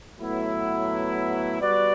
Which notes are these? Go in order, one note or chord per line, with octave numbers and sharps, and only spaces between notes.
A2 F#3 B3 E4
G3 B3 F#4 B4 D5